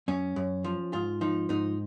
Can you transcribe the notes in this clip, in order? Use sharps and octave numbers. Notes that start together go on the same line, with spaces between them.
F#2 C#4
F#2
F3
G#2 F4
F3 D#4
G#2 D#4